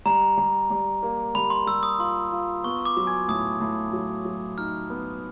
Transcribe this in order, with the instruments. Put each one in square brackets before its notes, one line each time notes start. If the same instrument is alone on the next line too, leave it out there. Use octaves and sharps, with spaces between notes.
[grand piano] G3 [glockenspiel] A#5
[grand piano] G3
G3
A#3
[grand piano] G3 [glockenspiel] B5
[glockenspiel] C6
[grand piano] G3 [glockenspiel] E6
[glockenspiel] D#6
[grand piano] F4 [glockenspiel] C6
[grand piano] F4
[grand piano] B3 [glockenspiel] C#6
[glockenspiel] D6
[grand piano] F#3
[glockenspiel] G#5 G#6
[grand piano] A2 [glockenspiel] D#6
[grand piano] A2
F#3
F#3
[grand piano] D#4 [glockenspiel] F6
[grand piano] B3